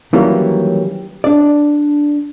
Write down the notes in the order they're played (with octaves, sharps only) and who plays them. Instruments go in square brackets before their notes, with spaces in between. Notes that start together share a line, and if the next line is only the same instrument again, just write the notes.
[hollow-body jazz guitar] D#3 E3 F#3 G3 A#3 C#4
D4 D5